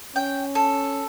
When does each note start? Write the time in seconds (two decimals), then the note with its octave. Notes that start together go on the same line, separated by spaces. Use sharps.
0.16 C#4 G5
0.55 A4